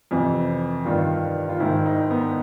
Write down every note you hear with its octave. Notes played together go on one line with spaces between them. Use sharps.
F2 C3 E3
G2 D#3 F4
F4
G#2 D#3 E4
D#4
B3